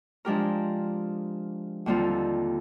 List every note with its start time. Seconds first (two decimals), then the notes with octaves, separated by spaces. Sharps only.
0.25 F3 G#3 D4 G4 A#4
1.86 D#2 D3 G3 C4 F4